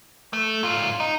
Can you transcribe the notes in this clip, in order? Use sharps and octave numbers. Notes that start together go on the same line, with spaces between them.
A3
G#2 F4
D#4